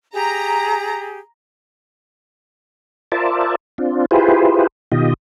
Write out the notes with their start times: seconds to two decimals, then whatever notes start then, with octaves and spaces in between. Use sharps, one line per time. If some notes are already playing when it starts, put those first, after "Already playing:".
0.14 G4 G#4 A#5
3.12 F4 A#4 C5 D5 E5 A5
3.78 C4 D4 F4
4.11 E4 F4 G4 G#4 B4 C5
4.92 B2 D#3 F4 G4 D#5